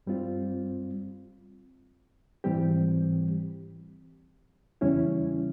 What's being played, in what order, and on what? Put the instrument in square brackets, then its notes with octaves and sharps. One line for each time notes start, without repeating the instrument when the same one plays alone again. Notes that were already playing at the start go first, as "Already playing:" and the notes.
[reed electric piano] G2 G3 C4 F4
G#2 E3 G3 C4 G4
E2 C#3 G3 C#4 E4